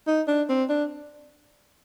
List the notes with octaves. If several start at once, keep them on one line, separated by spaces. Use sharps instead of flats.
D#4
D4
C4
D4